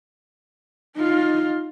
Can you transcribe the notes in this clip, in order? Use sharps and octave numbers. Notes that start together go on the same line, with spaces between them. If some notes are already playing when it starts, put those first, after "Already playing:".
D#4 F4